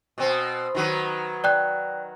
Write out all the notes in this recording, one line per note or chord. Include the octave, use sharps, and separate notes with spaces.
B2 C4
D#3 F#3 B4
D5 G5 F#6